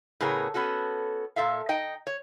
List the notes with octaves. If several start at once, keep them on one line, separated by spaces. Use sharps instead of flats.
A2 C#3 B3 G#4 A#4 C#5
B3 C#4 F#4 A4
A#2 A4 E5 F5
D#4 D#5 G5
C#5